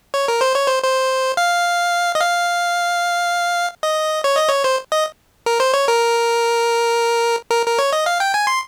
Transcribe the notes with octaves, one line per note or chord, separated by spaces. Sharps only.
C#5
A#4
C5
C#5
C5
C5
F5
D#5
F5
D#5
C#5
D#5
C#5
C5
D#5
A#4
C5
C#5
A#4
A#4
A#4
C#5
D#5
F5
G5
G#5
C6